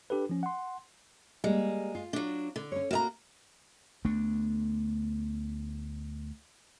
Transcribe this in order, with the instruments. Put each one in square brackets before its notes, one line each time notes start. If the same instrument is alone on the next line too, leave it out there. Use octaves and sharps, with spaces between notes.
[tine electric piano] D4 G4 A4 B4
F3 C#4
F#5 C6
[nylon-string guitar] G3 A#3 [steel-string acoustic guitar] G#3
[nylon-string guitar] F4
[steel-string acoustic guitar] F#3 D4
D3
[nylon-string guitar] C#4 C#5
[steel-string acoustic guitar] A#3 D#5 A#5 [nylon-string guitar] F#4
[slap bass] D2 A3 B3 D4